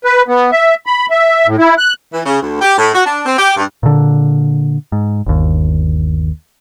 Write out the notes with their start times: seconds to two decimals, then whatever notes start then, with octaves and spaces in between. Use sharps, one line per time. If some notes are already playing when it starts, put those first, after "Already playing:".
0.04 B4
0.28 B3
0.52 E5
0.86 B5
1.10 E5
1.47 A2
1.59 E4
1.78 F#6
2.13 E3
2.26 C#3
2.42 D2
2.61 G4
2.78 A2
2.94 F#4
3.06 D4
3.26 C4
3.38 G4
3.57 G2
3.83 A#2 D3
4.92 G#2
5.26 G1 D#2